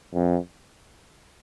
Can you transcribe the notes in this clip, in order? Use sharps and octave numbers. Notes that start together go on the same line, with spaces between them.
F2